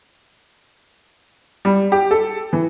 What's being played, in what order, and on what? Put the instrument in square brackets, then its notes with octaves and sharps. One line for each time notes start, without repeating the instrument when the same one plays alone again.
[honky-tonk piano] G3
G4
A4
E3